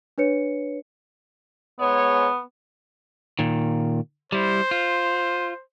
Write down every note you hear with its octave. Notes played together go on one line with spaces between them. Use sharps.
D4 B4 C#5 C#7
G#2 G#3 B3 C#5
A#2 D#3
G3 E4 C5
F4